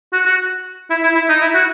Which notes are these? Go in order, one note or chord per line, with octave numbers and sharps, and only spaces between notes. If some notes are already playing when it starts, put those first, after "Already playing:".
F#4
F#4
E4
E4
E4
D#4
E4
F#4